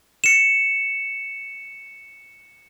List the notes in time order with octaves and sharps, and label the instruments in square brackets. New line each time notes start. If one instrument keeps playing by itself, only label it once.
[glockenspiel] C#7 E7